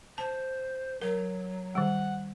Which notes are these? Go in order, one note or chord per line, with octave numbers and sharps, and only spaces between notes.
C5 A5
F#3 A#4
D#3 G3 F#5